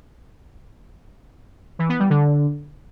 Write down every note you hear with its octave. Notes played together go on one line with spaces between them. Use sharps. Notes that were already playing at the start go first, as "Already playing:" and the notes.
E3
B3
G3
D3